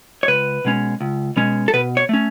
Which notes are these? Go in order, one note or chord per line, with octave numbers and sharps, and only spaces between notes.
C#5
C#2 B4
B2 G#3 C#4
C#2
B2 G#3 C#4
A4
B2 B4
C#5
A3 C#4